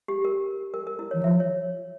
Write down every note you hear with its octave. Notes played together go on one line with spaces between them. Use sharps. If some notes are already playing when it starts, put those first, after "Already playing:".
G4
A#4
A#4
A#4
E4
E3 C#5
F3 E5
C#5